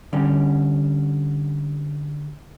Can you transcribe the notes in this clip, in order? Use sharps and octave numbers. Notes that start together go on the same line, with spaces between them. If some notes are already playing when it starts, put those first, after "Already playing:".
D3 G3 C#4